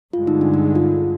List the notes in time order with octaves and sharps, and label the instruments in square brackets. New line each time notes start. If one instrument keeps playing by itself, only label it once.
[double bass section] G2 D3 G#3 [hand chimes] F4
[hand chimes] D#4
D4
D#4
F4